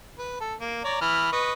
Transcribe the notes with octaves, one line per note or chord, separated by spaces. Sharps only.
B4
A4
A#3
C#5 D5 A#5
E3 B5 F6
B4 D#5 C#6